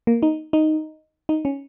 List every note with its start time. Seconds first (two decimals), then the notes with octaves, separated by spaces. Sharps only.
0.07 A#3
0.23 D#4
0.53 D#4
1.29 D#4
1.45 C#4